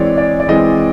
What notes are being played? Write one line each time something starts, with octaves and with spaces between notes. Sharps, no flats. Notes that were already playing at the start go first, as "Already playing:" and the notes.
Already playing: E3 G#3 C4 C#5 D5
D5
D5
E3 G#3 C4 D#5